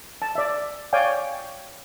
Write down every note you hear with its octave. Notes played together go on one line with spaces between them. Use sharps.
A5
D5 E5
C#5 D5 F5 G5 G#5